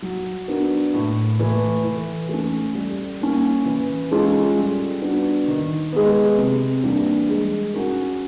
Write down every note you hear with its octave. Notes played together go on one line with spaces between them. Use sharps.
F#3
B3 D4 F#4 A#4
A2
E3 A3
E3
A3 C#4
G3
A#3 C#4
E3
G#3 C#4 F4 A4
G3
B3 D4 F#4
D#3
G#3 B3
C3
E3 G3 A#3 D4
G#3
C#4 F#4 A#4